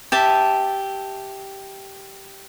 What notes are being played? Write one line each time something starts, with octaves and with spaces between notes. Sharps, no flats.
G4 E5 A5